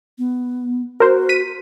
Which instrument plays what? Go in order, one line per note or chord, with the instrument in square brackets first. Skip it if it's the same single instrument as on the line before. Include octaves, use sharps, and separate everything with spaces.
[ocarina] B3
[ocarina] F#4 [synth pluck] A#4 C5
[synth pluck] B6 D#7